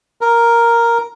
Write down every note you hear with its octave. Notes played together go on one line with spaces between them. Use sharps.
A#4